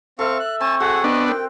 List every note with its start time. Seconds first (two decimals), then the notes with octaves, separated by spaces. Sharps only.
0.19 C4 A4 E5 F5 C#6
0.40 F#6
0.61 C4 G#5 A5 C#6
0.80 F#4 G#4 A4 F#5
1.04 B3 D4 D#5
1.27 A#4 G5